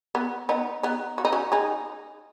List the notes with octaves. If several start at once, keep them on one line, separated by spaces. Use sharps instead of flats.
B3
B3 D#4
B3 D#4
F#4
D#4
C#4 F#4
D#4 G#4